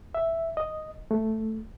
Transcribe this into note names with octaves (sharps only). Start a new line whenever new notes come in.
E5
D#5
A3